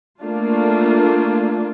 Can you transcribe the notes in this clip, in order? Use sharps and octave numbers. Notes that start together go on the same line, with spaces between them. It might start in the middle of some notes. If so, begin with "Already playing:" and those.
A3 A#3 D4 F4